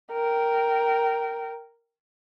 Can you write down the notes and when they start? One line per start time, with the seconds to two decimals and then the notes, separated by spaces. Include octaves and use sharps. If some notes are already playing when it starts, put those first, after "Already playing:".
0.12 A#4 G5